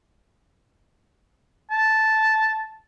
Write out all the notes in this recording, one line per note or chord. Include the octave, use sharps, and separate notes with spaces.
A5